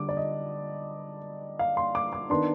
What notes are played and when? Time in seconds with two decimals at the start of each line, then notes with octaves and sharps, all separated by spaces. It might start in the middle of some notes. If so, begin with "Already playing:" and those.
Already playing: D3 G3 D4 D6
0.09 D5
0.17 D#5
1.59 F5
1.77 C6
1.95 D6
2.13 D6
2.30 D#3 B3 D4 C6